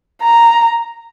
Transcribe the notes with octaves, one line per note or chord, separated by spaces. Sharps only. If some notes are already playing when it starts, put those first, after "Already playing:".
A#5